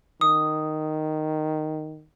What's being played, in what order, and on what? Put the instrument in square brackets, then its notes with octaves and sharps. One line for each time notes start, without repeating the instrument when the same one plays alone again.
[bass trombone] D#3 [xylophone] D#6